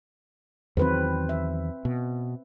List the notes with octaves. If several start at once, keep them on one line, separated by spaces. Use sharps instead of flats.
E2 D#3 F#3 C4 B4 C5
E5
B2